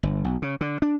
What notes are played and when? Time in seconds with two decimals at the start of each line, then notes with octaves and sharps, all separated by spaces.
0.03 G1
0.24 B1
0.42 C#3
0.61 D3
0.82 D4